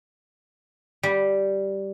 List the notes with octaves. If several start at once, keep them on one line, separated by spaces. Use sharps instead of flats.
G3